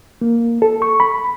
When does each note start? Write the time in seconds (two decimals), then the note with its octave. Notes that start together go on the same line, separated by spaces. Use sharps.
0.21 A#3
0.62 A4
0.82 C#6
1.00 B5